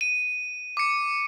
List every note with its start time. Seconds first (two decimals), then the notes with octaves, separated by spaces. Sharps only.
0.01 D#7
0.77 D6 C#7